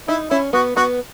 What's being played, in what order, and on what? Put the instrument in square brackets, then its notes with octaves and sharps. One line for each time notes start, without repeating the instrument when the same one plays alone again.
[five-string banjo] D#4 [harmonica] E4
[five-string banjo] C#4 [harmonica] E4
[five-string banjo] B3 [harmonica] F#4
[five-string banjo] B3 [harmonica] F#4